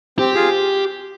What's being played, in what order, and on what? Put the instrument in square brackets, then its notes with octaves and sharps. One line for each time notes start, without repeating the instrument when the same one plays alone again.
[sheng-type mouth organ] C4 [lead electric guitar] G4
[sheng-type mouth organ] F4 G#4